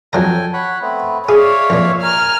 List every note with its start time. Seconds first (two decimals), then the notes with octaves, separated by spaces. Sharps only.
0.13 F2 F#3 A4 G5 G#5 A#5
0.53 C#5 F#5 B5
0.82 A3 B3 C4
1.29 G#4 C#5 D5 E5 F5
1.70 F2 A#2
2.02 A#4 G#5 F6